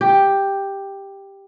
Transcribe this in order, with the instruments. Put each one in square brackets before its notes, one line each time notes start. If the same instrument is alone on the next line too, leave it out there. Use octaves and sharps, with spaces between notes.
[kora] G4